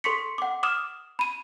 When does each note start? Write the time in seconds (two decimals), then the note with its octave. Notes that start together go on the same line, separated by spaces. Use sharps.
0.04 A4 C6 C#6 B6 C#7
0.38 F#5 D6
0.63 D6 D#6 F6 E7
1.19 B5 D#7